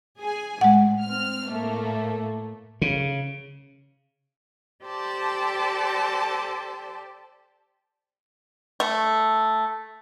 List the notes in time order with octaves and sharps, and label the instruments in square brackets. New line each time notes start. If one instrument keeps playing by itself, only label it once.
[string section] G#4 G#5
[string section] A2 [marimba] G#3 F#5
[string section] C4 F6
A2 A3 A#3
[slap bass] C#3
[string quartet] G4 A4 C5 D5 A5
[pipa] A3